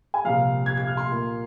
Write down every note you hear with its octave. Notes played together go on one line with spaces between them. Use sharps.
G#5
C2 A#2 F3 F5
G#6
G#6
F6
C6
A#2 A#3